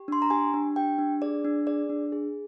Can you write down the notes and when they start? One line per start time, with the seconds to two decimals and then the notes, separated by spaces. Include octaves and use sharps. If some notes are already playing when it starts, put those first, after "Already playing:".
Already playing: G4
0.08 D4 C6
0.22 A#5
0.30 G4 G#5
0.54 D4
0.76 G4 G5
0.98 D4
1.22 G#4 D5
1.45 D4
1.67 G#4 D5
1.89 D4
2.12 G#4